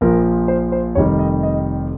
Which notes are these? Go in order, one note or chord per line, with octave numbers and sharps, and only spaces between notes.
A#1 A#2 F3 A#4
C5
C5
F1 F2 D#3 G3 C#5
D#5
D#5